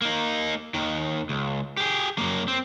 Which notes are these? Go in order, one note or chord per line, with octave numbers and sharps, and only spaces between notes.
A#3 D#4
D#2 D#3
C#2
G4 G#4
F#2 A#3
C4